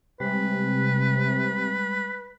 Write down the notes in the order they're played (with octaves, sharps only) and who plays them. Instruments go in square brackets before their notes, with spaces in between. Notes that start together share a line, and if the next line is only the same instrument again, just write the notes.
[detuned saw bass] C3 [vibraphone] G3 G#3 [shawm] B4